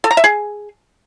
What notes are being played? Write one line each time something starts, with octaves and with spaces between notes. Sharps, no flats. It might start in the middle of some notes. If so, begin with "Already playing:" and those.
A4
A#5
E5
G#4